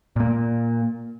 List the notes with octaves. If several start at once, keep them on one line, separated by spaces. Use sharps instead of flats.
A#2 A#3